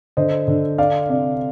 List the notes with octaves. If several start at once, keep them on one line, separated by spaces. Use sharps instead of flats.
D3 C5 D#5
D3
D4 D5 F5
C3 D5